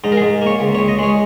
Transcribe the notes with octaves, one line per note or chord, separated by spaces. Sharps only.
G#2 D#4
A#4
G#4
G#2
A#3 C#5
C#2
C#5
C#2
D#5
G#3 C#5